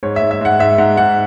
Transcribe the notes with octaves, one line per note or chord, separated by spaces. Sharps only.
G#2 C#5
E5
G#2
E5
G#2 F#5
G#2 E5
G#2 F#5
G#2 F#5